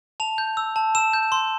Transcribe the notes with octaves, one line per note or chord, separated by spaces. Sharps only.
A5 F7
G6
E6
A5
E6 E7
G6
C6